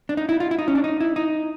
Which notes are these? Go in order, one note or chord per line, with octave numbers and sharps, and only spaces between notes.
D4
D#4
E4
F4
E4
D#4
C#4
D4
D#4
E4
D#4